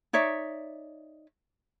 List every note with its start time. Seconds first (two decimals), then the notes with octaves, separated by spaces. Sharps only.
0.13 D#4 C#5 D5 E5